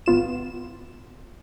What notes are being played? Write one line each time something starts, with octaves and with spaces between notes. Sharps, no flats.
G#1 B3 F4 E7